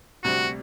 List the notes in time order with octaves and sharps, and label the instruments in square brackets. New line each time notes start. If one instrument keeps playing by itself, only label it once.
[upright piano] D2 C3 G3 [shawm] F#4